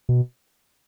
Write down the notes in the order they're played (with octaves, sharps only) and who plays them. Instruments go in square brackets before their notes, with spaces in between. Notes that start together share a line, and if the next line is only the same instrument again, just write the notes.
[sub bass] B2